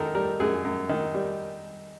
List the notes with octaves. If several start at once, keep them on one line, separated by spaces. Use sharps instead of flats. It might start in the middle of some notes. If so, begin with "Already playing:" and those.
Already playing: F#2 D#3 A4 A#4
G3 A#4
F#2 G#4
F#2
D#3
G3